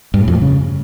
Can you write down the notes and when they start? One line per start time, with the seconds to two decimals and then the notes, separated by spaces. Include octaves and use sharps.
0.14 G2
0.21 A2
0.28 F2
0.35 A2
0.42 C#3